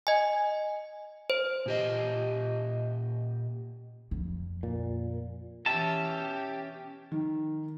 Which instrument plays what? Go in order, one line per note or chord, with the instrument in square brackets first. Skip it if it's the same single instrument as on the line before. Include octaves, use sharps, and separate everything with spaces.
[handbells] D#5 G#5
C5
[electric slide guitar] A#2 G4 D#5
[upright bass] F2
[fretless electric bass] A#2
[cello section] B2 E3 [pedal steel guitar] C#4 E5 A5 [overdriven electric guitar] G4
[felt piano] D#3